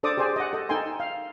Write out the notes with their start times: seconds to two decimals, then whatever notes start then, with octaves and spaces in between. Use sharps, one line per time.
0.03 D4 A4 C5 D5 D6 D#6
0.17 G4 G#4 C5 D5 G#5
0.36 D#5 F#5
0.53 A4 D#5
0.69 D#4 A4 G5 G#5 C6
1.00 F5